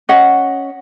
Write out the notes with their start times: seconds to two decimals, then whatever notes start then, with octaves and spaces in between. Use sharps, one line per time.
0.09 C#4 D#5 F#5